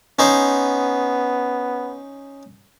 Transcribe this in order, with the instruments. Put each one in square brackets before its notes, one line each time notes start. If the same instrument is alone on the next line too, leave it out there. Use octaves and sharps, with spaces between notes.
[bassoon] B3 [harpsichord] C#4 D#4 C5